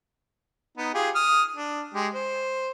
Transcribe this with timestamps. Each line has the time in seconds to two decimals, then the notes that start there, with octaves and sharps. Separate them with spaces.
0.78 B3 D#4
0.94 F4 G4 G#4
1.15 D#6 F6
1.56 D4
1.94 G#3 G4
2.14 C5